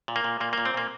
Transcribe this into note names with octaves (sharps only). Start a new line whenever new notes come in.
A#2
A#3
A#2
A#2 A#3
A#2 A#3
C4
A#2 A#3